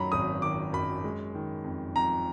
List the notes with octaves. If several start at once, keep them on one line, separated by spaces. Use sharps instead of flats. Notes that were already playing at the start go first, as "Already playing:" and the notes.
Already playing: F#2 D#3 F#3 A#5 B5
G#1 D#6
D#3 D6
F#2 B5
G#3
D#3
F2
F2 A#5